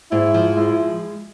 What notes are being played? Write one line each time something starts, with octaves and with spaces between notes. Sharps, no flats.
G#2 E4
F3
G#3 E4